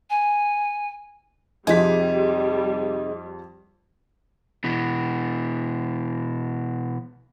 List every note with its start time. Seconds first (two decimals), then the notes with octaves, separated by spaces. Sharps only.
0.09 G#5
1.67 F2 C3 G3 D#4 F4 G#4 B6
4.64 B2 E3